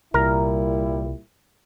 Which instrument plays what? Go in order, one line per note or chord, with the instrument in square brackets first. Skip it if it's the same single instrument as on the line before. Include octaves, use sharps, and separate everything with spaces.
[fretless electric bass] C2 [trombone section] A#2 G3 E4 [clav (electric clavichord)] A#4